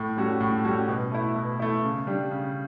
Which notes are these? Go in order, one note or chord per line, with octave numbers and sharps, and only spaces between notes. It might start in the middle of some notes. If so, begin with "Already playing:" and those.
Already playing: A2
G3 C#4 F#4 A4
A2
G3 C#4 F#4 A4
B2
A3 E4
B2
A3 E4
C#3
G3 D4
C#3